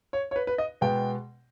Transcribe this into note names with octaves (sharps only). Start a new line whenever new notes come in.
C#5
C#5
B4
B4
D#5
B2 G#3 B3 G5